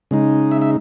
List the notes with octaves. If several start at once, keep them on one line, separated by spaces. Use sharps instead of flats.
C#3 G#3 D#4
E5
E5